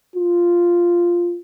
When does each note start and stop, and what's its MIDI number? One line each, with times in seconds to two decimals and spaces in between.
0.16 1.39 65